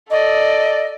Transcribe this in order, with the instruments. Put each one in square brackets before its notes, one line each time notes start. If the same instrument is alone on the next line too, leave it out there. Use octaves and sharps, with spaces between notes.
[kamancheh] A4 D5 [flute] D#5